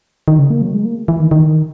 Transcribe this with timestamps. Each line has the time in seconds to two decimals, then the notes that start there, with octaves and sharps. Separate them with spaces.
0.28 D#3
0.39 C#3
0.50 A#3
0.62 F#3
0.74 G#3
0.85 A#3
1.08 E3
1.20 D#3
1.31 D#3